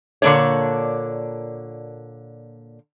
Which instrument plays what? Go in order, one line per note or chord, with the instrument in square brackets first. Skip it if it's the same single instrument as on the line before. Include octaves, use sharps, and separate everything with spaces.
[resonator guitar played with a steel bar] A#2 D3 A#3 D4 C#5